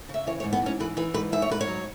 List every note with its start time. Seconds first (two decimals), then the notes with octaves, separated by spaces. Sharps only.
0.09 C#3 E5
0.27 E3 C#5
0.40 C#5
0.44 G#2
0.53 B3
0.62 G#2 C#4
0.80 E3 B4
0.97 E3 B4
1.14 G#2 B4
1.32 G#2 E5
1.42 C#5
1.50 G#2 B4
1.61 C#5
1.67 F#3